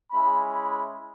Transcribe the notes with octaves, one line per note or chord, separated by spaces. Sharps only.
G#3 C#4 E4 B5
B5